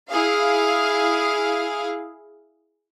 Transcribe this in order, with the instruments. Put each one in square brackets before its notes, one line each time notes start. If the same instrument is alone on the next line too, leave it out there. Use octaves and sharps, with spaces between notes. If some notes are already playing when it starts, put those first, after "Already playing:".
[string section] E4 G#4 F5